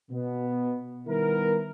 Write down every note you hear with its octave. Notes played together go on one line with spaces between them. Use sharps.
B2 B3
D#3 G3 B3 E4 A#4